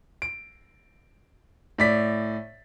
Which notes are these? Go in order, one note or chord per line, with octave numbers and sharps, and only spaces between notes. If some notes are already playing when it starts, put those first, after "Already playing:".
D7
A2 D5 B6